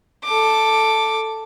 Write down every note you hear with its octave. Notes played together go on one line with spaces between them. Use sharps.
A4 D6